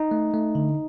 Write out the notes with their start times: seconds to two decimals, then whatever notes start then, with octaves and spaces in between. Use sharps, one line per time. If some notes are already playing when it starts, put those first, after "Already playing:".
Already playing: D#4
0.11 A3
0.34 A3
0.55 D3